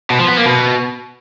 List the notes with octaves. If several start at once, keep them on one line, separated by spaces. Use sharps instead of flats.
B2
F3
B3
A#3
B2